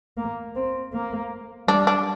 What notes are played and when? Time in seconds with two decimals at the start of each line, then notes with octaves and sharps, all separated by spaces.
0.18 A#3
0.56 C4
0.94 A#3
1.68 G3 D4
1.87 D4